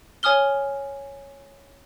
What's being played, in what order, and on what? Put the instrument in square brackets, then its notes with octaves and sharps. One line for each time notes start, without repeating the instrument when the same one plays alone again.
[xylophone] C#5 G#5 D#6 F6 G7